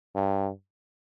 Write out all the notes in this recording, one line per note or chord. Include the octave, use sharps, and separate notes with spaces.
G2